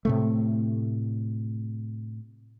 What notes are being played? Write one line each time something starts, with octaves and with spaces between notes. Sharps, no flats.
A2 C3 A3